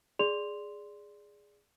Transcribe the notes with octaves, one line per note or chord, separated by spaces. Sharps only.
G#4 D5 C6 F7